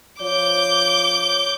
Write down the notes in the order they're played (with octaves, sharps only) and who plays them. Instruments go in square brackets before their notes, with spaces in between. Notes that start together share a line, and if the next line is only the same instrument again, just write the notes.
[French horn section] F3 C5 C#5 [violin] D6 G6